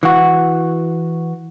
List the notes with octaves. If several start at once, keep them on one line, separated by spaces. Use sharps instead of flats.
E3 F#4